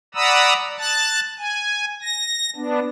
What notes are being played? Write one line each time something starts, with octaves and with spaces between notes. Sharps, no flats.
D5 F#5 A#5 B5 D#6 E6
A5 F#6 A6
G#5
A#6
B3 D4